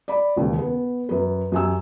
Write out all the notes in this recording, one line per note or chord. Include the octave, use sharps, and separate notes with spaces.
D5 B5
E1 D#2 C#3
B3
F#2 B4
F#2 G4 G#5 E6